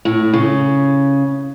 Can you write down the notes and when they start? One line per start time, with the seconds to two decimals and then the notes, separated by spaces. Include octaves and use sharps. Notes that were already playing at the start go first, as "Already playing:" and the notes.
0.05 A2
0.33 C#3